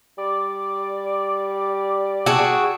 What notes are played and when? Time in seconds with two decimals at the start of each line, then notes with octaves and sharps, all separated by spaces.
0.18 G3 D5
2.26 F#4 G#4 G5 A5 E6